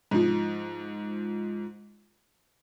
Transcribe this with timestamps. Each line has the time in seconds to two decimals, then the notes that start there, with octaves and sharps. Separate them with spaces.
0.11 G#2 F3